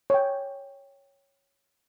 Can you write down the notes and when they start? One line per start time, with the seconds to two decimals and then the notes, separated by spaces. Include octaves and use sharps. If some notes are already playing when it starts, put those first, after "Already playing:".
0.10 C#5 G5